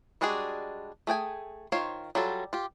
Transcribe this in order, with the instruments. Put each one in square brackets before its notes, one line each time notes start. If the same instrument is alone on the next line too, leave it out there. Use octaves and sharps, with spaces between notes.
[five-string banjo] G3 G#3 D4 F#4 G#4
A3 G#4 G5 G#5
D#3 F4 C5 C#5 F5
F#3 G3 F4 A4
F4 G4